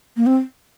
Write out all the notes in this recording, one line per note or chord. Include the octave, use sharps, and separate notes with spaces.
A#3
C4